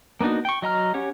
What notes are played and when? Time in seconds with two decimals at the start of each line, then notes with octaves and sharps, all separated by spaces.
0.21 A#3 B3 D4 D#4 F#4
0.45 G5 C#6
0.62 F#3 D#5 A#5 F6
0.94 C#4 G4 C#5 F#5